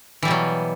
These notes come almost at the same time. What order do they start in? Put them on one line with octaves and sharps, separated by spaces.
E3 G3 B2 F#3